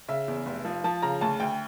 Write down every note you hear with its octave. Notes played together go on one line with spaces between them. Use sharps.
C#3 E5
E2
F1
F3
F3 A5
C#3 A#5
D2 A5
D2 G5